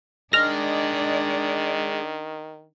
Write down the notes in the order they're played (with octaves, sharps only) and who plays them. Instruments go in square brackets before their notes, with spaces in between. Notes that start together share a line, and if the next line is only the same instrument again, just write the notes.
[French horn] D#3 [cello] D4 D5 [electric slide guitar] G#4 D#5 [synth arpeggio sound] F6 A#6